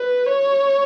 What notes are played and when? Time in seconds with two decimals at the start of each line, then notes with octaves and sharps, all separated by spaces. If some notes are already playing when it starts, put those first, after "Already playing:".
Already playing: B4
0.26 C#5